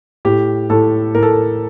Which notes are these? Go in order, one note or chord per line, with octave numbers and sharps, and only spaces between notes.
A2 G4
A2 A4
A2 A#4
A4
A#4